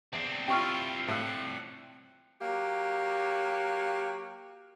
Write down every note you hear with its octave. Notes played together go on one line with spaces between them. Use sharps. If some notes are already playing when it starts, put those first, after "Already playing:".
E2 C4 D4
C3 E4 F4 G5 C#6 F6
A2 F5 F#5 E6
F#3 A#3 G4